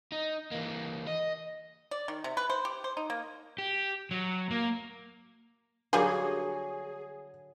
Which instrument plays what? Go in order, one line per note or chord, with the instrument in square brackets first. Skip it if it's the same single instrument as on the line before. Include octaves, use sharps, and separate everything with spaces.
[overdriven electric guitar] D#4
E3 A#3
D#5
[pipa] D5
D#3
C3
B4
C5
G4
C5
D#4
A#3
[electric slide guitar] G4
F#3
A#3
[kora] D3 F#3 F#4 [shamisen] G3 A#3 [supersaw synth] G#4 [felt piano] G#5